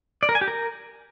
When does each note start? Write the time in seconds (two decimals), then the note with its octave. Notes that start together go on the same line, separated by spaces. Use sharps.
0.23 D5
0.29 A#4
0.35 G#5
0.41 G4
0.48 A#4